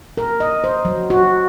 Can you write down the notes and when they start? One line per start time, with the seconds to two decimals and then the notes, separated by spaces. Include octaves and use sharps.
0.17 A#4
0.40 D#5
0.64 C5
0.85 F#3
1.10 F#4